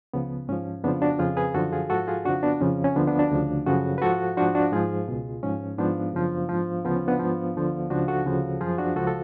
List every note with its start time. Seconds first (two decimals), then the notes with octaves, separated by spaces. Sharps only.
0.13 C#2 C#3 F3 B3
0.49 G#2 F3 C#4
0.84 F2 C#3 F3 B3 D4
1.02 D4 F#4
1.19 F2 C#3 F3 F4 G#4
1.37 G#4 B4
1.54 F#2 D3 F3 F#4 A4
1.72 F4 G#4
1.90 G#2 F3 F#4 A4
2.08 F4 G#4
2.25 F2 C#3 F3 D4 F#4
2.43 B3 D4
2.61 F2 C#3 F3 C#4
2.84 C#4
2.96 D2 D3 F3 B3 D4
3.07 B3 D4
3.19 D4 F#4
3.32 D2 C#3 F3
3.66 F#2 C#3 F3 F#4 A4
3.98 B4
4.02 G#2 F3 F#4 A4
4.37 G#2 F3 D4 F#4
4.55 D4 F#4
4.73 G#2 F3 F4 G#4
5.08 C#2 B2
5.43 G#2 F3 C#4
5.78 G#2 F3 B3 D4
6.13 F#2 C#3 F3
6.49 G#2 F3
6.85 D2 C#3 F3 B3
6.96 C#4
7.08 B3 D4
7.19 G#2 F3
7.55 D2 D3 F3
7.90 C#2 C#3 F3 D4 F#4
8.08 F#4 A4
8.26 D2 C#3 F3
8.61 F#2 F3 F4 G#4
8.78 D4 F#4
8.96 C#2 C#3 F3 F#4 A4
9.07 A4